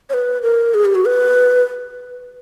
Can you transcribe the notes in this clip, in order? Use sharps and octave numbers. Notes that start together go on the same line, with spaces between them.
C#5
B4
A#4
G#4
G4
F#4
B4